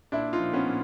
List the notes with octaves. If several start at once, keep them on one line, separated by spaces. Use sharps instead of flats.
A#2 D4 E4
D#4 F4
F3
B3 C#4
A#2